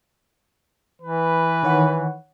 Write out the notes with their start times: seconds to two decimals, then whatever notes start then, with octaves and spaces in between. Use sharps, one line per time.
1.02 E3 B4
1.63 D#3 C#5 F#5